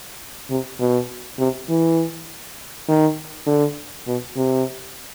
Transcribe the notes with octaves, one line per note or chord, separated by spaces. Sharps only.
C3
B2
C3
E3
D#3
D3
B2
C3